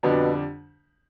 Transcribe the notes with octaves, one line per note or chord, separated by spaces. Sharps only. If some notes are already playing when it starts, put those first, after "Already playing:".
F2 B2 D3 G3 D4 G4